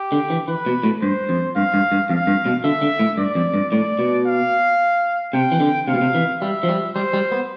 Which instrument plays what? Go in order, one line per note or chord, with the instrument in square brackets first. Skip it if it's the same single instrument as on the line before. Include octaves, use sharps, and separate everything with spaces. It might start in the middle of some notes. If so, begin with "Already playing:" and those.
Already playing: [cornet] G4
[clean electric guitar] D3
E3
[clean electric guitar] E3 [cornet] B4
[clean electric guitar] B2
A2
[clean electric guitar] G2 [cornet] C5
[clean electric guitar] F2
[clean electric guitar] G2 [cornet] F5
[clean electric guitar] G2
G2
[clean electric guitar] F2 [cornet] F5
[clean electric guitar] G2
B2
[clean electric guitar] D3 [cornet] E5
[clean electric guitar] D3
A2
[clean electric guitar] G2 [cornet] D5
[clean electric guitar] F2
G2
[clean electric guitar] A2 [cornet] D5
[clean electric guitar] B2
[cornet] F5
[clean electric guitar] C3 [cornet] G5
[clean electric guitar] E3
D3
[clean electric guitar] C3 [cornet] F5
[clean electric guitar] B2
C3
E3
[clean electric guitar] G3 [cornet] E5
[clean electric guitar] F3
G3
[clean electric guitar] G3 [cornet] C5
[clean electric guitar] G3
B3